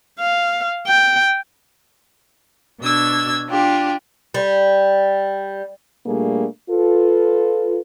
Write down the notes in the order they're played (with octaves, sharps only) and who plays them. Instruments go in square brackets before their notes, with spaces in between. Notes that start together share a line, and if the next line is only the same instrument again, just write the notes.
[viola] F5
G5
[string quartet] B2 D4 E6 G#6
D4 F4 G4
[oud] G3
[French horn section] A#2 G3 A3 A#3 D4 G#4
F4 A4 B4